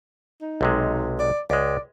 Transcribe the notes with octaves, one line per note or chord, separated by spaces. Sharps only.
D#4
B1 C3 G#3
D5
C#2 G#3 D5